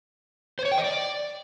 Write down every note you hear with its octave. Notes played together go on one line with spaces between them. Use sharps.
C5
C#5
G5
D#5
D5